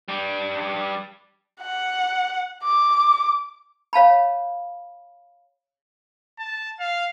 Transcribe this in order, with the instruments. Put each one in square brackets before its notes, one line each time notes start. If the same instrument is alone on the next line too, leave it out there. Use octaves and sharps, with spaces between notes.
[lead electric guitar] G3 D4
[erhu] F#5
D6
[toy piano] C#5 F5 A5 B5
[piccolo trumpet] A5
F5